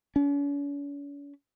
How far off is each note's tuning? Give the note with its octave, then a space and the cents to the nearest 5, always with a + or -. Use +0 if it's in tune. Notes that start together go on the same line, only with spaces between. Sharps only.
C#4 +45